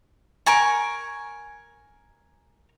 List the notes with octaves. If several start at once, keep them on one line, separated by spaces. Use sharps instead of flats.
A#4 G#5 C#6